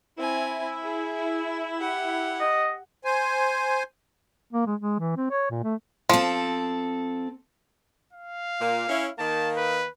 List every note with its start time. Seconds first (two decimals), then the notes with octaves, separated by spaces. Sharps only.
0.18 C4 E4 G#5
0.83 G#4
1.78 G4 F#5
2.40 D#5
3.05 C5 G#5
4.53 A#3
4.66 G#3
4.80 G#3
4.99 E3
5.17 C4
5.31 C#5
5.50 A#2
5.64 A3
6.09 F3 C4 A4
8.13 F5
8.60 A#2 A#3
8.89 C#4 E4
9.18 D#3 A#3 A5
9.56 B4